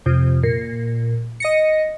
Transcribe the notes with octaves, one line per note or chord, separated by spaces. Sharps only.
F2 C3
A#2
D#5 A#6 C#7